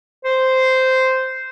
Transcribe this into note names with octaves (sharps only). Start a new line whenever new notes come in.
C5